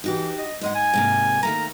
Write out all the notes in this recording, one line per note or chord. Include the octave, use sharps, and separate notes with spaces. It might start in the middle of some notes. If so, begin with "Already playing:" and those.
E3 D#4 F#4 G4
D#5
G#2 G#3 D#5 F#5
G#5
G#2 C3 A#3
D#3 A3 A#3 A#5